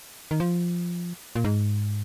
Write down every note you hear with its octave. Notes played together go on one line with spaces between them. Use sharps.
D#3
F3
A#2
G#2